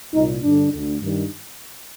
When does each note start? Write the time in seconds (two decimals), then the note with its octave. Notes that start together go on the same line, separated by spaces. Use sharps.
0.14 C2 A#2 D#4
0.43 G2 D3 D4
0.72 D2 D3
1.01 G2 D#3